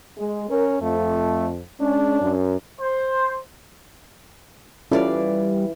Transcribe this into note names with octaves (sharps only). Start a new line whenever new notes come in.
G#3
C#4 A#4
F2 A3
G#3 C#4 D4
F#2
C5
E3 G3 C#4 F4 A4 D5 F5